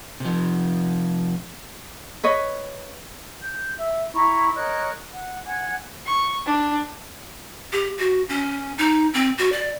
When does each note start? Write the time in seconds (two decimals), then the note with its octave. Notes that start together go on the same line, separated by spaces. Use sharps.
0.20 C3 F3
2.24 B4 C#5 D#5
3.41 G6
3.76 E5
4.14 E4 A#5 B5 C#6
4.55 A#4 C#5 D#5 F#6
5.12 F#5
5.46 F#5 G#5 G#6
6.06 C#6
6.46 D4
7.72 G4
7.98 F#4
8.29 C#4
8.78 D#4
9.14 C4
9.38 F#4
9.52 D5